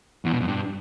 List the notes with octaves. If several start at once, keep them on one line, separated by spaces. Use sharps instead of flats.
E2
B2
F2
G2